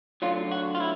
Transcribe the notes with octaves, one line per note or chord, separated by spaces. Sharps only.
D2 D3 F#3 F4
F#4
F4
E4